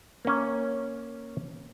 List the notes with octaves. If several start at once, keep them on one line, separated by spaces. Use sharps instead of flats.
A#3 C#4